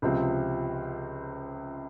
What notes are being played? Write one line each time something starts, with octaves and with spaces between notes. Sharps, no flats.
C#2 C3 F3 C4